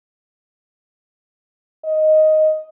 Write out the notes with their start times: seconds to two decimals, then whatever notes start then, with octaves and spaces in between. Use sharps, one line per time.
1.85 D#5